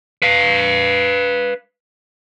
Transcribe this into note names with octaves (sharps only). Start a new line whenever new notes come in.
B4 F5